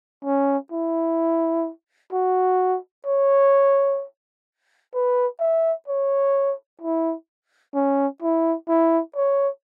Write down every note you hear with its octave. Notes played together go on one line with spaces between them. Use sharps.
C#4
E4
F#4
C#5
B4
E5
C#5
E4
C#4
E4
E4
C#5